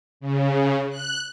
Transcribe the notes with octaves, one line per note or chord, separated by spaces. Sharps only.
C#3
F#6